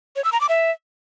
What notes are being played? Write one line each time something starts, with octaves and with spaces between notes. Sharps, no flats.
C#5
E6
A#5
D6
E5